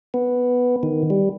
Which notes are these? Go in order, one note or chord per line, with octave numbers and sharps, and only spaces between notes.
B3
D#3
G3